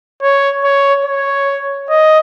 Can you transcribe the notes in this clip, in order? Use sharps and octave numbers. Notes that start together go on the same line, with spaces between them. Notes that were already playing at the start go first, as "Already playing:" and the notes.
C#5
C#5
C#5
D#5